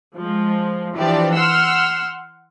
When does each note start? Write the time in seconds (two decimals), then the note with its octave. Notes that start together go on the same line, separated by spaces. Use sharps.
0.16 F3 G#3
0.95 E3 F3 D4 G4 D5
1.34 F#5 C6 E6 F6